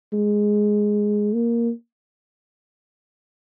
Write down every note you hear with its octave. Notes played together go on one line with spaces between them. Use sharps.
G#3
A#3